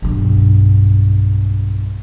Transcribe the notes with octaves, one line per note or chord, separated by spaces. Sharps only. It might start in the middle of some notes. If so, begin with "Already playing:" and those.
B1 G2